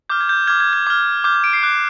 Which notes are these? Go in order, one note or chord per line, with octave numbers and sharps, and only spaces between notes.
D6 F6 G6
G#6
G6
D6 F6 G#6
G#6
G#6
D6 F6 G#6
D6 F6 G6
G#6
D7
C7
D6 F#6